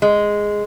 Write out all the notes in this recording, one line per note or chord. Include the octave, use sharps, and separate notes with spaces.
G#3